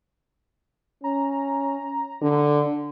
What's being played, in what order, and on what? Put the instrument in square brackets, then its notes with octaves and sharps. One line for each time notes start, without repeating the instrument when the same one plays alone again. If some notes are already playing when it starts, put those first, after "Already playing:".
[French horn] C#4 [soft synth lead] A#5
[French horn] D3 [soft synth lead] D4